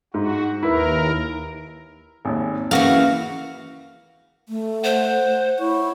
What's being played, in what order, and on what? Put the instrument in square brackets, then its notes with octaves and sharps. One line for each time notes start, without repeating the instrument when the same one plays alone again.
[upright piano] G#2 [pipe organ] F#4
[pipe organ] D#2 A#4 [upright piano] E4 B4
[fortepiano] G#1 D#2
[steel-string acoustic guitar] C#3 E3 [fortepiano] A#3 [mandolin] F#4 F5
[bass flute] A3
[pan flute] C5 [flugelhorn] F#5
[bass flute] E4 [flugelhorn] C#5